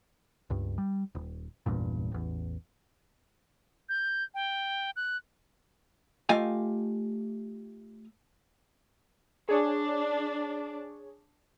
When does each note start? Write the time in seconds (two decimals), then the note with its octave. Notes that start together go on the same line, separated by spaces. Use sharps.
0.50 C#2 G2
0.78 G3
1.15 D#1
1.66 G#1 E2 G2 A#2
2.12 A1 E2
3.89 G6
4.34 G5
4.96 F#6
6.29 A3 F4 G4 D#5 F5 G#5
9.49 D4 G#4 C#5